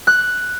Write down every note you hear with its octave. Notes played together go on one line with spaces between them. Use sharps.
F#6